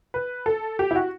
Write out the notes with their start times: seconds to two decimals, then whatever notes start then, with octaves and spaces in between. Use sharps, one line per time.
0.14 B4
0.46 A4
0.79 G4
0.91 E4
0.96 F#4